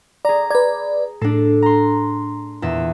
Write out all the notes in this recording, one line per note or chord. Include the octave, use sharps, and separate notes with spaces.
G#4 D5 A#5
B4 D5 G#6
A2 D4 A4
A#5 C6
E2 A#2 E5